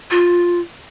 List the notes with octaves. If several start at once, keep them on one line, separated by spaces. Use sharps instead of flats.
F4